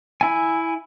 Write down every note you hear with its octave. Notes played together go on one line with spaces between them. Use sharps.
E4 G#5